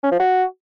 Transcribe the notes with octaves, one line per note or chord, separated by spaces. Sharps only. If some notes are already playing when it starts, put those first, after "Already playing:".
C#4
F3
F#4